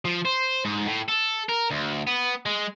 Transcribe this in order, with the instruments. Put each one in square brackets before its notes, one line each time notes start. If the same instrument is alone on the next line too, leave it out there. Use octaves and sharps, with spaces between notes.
[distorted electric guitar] F3
C5
G#2
A2
A4
A#4
D2
B3
G#3